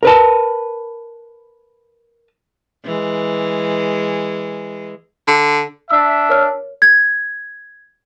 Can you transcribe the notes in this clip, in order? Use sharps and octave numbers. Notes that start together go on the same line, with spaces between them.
A#4 B4 A5
E3 G#3
D3
D4 E5 E6
A#4 C#5 F6
G#6